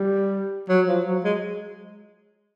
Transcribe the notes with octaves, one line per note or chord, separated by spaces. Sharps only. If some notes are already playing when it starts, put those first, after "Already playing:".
Already playing: G3
F#3
F3
F#3
G#3